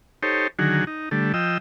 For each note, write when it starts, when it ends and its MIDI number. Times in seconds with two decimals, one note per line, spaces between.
0.23 0.47 63
0.23 0.47 67
0.23 0.47 69
0.23 0.47 72
0.23 0.47 73
0.59 0.85 50
0.59 0.85 51
0.59 0.85 54
0.59 0.85 66
0.59 0.85 68
0.87 1.09 63
1.11 1.33 50
1.11 1.33 55
1.11 1.33 57
1.34 1.58 53
1.34 1.58 75
1.34 1.58 79
1.34 1.58 88